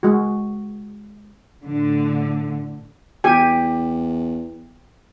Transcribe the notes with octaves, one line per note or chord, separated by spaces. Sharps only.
G#3 F#4
A2 D3
E2 G4 G#5